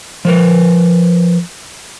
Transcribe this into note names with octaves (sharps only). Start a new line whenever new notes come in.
F3 A#4 B4